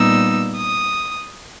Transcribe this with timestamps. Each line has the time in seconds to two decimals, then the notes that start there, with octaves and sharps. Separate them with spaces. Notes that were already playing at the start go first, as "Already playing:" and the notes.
Already playing: A#2 G3 B3 D#4 E6
0.58 D#6